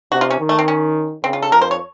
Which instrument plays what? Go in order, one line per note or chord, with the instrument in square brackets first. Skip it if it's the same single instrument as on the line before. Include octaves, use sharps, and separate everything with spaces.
[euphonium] C3 [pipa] F#4
[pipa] F4
C#4
[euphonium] D#3
[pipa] A3
C4
C#4
[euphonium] C#3 [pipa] C4
[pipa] F4
A4
[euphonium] F2 [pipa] A#4
[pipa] C5
C#5